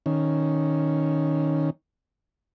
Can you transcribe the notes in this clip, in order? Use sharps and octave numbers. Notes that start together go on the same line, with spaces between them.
D#3 C#4